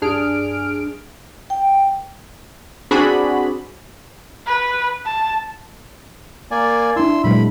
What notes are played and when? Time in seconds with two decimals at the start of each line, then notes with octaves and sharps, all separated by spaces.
0.02 G2 D4 G#4 F6 D7
1.50 G5
2.91 C4 D4 F#4 G#4 B5
4.46 B4
5.05 A5
6.51 A#3 D5 G#5
6.96 D4 E4 C6 E6
7.24 A#2 F#3 G#3 B5